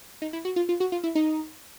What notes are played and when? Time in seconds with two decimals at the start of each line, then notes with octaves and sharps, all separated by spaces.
0.22 D#4
0.33 E4
0.45 F#4
0.56 F4
0.69 F4
0.80 F#4
0.92 F4
1.04 E4
1.15 D#4